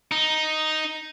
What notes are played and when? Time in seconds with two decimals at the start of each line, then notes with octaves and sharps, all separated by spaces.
0.11 D#4